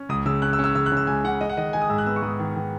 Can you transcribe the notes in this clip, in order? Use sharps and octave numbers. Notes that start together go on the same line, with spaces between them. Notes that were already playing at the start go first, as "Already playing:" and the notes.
Already playing: C#4
C#2 D#6
C#3 E6
C#4 F#6
E6
C#4
E6
C#3 E6
F#6
C#3
E6
C#2 G#5
C#3 F#5
G#3 D#5
F#5
D#3 D#5
G#3 G#5
D#6
G#2 E6
F#6
B3 E6
C#6
G#2 D#6
D#3
D#3